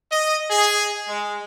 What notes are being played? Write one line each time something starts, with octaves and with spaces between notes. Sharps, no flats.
D#5
G#4
G#3